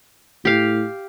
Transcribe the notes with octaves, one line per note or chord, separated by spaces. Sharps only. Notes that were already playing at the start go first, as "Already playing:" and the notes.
A2 G4 F5